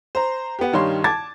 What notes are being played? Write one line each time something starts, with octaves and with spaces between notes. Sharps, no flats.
C5 A#5
B3 G4
G2 D#3 G3 C#5 F5 C6
A5 D6 G#6 A6